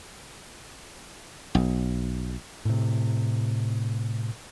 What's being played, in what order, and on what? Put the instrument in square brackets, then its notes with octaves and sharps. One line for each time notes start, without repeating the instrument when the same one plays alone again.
[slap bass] B1
[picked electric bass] A2 C3